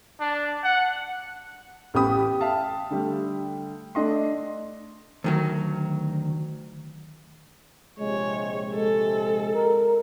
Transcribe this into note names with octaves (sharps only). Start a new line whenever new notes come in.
D4
F#5
A1 B3 G4 B5 D#6
G4
E5 F5 A5
D3 G3 A3
A3 D4 D#5 C6
D2 D#3 F#3
A#1 C3 G#3 C#5
G#3 A4
A#4